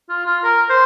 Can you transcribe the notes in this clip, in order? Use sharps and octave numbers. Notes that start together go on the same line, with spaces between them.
F4
F4
A#4
C5